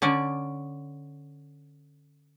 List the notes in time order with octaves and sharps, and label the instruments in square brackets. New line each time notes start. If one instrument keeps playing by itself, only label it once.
[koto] D3 C#4 D5